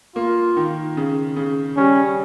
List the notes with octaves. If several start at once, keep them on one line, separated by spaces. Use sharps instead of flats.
A#3 F4
D#3
C#3
C#3
G3 C#4